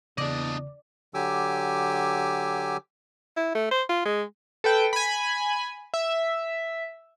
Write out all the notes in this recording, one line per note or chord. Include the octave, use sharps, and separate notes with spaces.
E2 C#3 D4 D5 D#5
D3 F#3 G4 G#5 D6 E6
E4
A3
C5
F4
G#3
A4 B4 G5
G#5 B5
E5